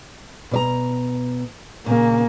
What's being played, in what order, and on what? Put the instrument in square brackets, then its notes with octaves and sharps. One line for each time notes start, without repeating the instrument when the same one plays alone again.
[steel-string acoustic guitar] B2 D5 A#5
[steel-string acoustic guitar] A#2 C#3 [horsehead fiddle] A#3